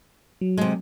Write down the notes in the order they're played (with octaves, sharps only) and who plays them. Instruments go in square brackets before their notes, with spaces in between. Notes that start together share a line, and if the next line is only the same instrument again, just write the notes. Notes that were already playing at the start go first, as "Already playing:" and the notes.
[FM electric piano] F#3
[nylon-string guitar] C3 G#3